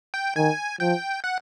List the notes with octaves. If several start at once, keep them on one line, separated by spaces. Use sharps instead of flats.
G5
D#3 G#5
F3 G5
F#5